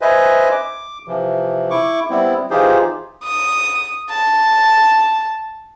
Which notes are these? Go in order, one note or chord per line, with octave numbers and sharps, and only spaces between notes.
B4 C5 D#5 E5 G#5
D6
C3 E3 F3
E4 C#6 D6
G3 B3 C4 E4
E3 D#4 F4 G4 G#4 C5
D#6
A5